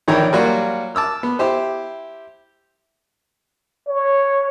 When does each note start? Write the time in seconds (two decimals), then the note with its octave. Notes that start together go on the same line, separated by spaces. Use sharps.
0.08 A#1 D#3 E3 C#5 G5 A#5
0.33 F#3 G3 A#3 F4 F#4
0.95 A5 D6 E6 F6
1.23 B3
1.39 E4 G4 C5
3.88 C#5